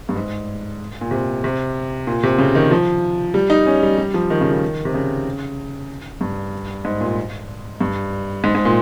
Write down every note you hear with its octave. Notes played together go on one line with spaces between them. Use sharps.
G2
G#2
A#2
C3
C3
A#2
C3
C#3
D#3
F3
G3
D#4
C#4
G3
G3
F3
D#3
C#3
D#3
C3
C#3
G2
G#2
A#2
G2
G#2
G#2
A#2